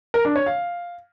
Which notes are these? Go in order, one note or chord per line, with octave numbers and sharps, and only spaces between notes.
A#4
D4
C#5
F5